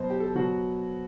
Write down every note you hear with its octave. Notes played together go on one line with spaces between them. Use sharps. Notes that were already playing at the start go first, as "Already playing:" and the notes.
Already playing: B2 F#3 C5
G4
A4
B2 F#3 F#4